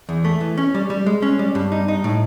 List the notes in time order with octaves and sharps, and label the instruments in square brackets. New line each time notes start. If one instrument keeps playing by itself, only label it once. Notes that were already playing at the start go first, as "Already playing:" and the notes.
[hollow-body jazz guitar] E2
A3
E3
C#4
G3
G3
G#3
C#4
G3
G2
D#4
D#4
A2